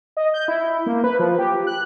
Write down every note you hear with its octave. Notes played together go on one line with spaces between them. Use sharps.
D#5
G6
E4
A#3
B4
F3
G4
F#6